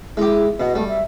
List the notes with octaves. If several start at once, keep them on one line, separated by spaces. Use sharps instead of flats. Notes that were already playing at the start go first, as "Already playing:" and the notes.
G#3 E4 G4
B2 D#5
G3 A3
E5